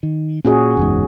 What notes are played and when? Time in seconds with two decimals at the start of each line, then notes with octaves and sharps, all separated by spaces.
0.03 D#3
0.45 A#2 C#4 F#4 G#4
0.77 F#1 E2 G#2